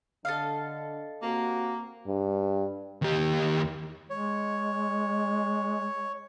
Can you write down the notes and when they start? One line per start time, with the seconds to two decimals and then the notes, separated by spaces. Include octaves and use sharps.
0.25 D3 A4 D#5 F5
1.23 C3 A#3 C4 F#4
2.07 G2
3.02 D#2 G4
4.10 G#3 C#5